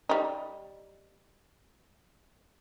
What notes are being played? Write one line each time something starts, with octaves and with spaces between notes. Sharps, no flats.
G3 D#4